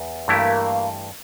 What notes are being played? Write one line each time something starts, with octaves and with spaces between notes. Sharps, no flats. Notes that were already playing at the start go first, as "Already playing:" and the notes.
Already playing: E2
G2 E3 A3 A#3 E4 G4